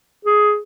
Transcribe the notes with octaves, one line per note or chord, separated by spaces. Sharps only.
G#4